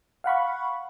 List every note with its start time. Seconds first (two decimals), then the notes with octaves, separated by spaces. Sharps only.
0.24 F5 F#5 B5 C#6